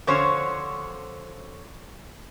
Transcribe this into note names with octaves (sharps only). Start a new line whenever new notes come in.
D3 F3 C#4 F#4 C5 C#5